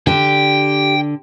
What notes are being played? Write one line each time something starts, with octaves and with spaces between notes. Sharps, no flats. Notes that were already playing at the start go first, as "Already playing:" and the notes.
D3 D4 G4 G5